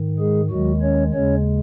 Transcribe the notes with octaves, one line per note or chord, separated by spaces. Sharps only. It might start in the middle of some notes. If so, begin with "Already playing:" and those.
Already playing: G#2 D#3
G#3 G#4
D#2 D#3 F#3 G#3 F#4
C#4 C#5
D#2 C#3 G#3 C#4 C#5